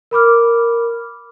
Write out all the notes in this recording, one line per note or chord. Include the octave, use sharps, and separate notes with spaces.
A#4 B5 D6 F6